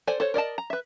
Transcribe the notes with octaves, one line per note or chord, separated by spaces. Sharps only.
A4 C5 D5 G#5
A4 C5 C#5
A#4 D5 D#5 A5
A#5
B4 E5